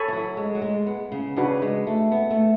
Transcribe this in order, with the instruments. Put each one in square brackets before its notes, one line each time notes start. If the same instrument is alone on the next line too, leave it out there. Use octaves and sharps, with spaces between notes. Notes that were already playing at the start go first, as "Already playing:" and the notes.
Already playing: [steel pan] A4 C#5 G#5 B5
[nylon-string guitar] E3
F#3
G#3
F#3
G#3
B3
C#3
[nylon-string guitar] C#3 [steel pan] D4 F#4 B4
[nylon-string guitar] G#3
A3
B3
A3